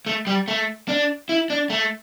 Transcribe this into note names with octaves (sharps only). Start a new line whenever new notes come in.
A3
G3
A3
D4
E4
D4
A3